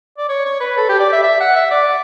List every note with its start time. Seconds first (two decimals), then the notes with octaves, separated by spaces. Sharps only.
0.18 D5
0.29 C#5
0.45 C#5
0.60 B4
0.77 A4
0.89 G4
1.00 D5
1.13 E5
1.23 E5
1.40 F#5
1.56 E5
1.71 D5